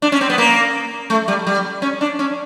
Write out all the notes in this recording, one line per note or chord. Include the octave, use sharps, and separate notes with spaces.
D4
C#4
C4
B3
A#3
A3
G3
G3
C#4
D4
C#4